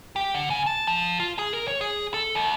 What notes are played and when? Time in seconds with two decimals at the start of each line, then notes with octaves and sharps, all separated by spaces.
0.16 G4
0.34 D3
0.50 C#3
0.66 A5
0.87 F3
1.20 F4
1.39 G#4
1.53 A#4
1.68 C#5
1.81 G#4
2.14 A4
2.35 D#2